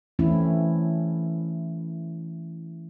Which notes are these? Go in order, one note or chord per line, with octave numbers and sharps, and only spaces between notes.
E3 A3 C4 C#4 E4